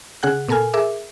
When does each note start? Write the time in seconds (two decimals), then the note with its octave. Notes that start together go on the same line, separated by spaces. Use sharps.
0.23 C#3 G#4 F#5 F#6
0.48 A#2 B3 A4 A#4 G#5 F6
0.74 G#4 A#4 E5 D6